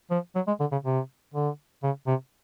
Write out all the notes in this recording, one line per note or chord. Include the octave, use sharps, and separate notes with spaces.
F3
F#3
G#3
D3
C#3
C3
D3
C#3
C3